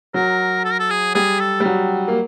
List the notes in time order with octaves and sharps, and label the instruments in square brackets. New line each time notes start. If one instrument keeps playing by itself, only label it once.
[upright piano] F#3 [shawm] A#4
[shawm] A4
A#4
A4
G#4
[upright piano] G3 [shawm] G#4
[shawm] A4
[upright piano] G3
F#3
A#3